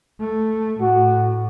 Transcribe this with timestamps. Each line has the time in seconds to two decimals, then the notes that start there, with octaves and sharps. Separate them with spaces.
0.21 A3
0.81 A2 F#4